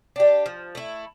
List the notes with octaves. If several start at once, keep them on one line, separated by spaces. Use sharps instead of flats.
D4 G4
F3
A3 E4